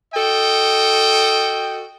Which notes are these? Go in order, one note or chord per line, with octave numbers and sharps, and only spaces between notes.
F#4 A4 D#5 G5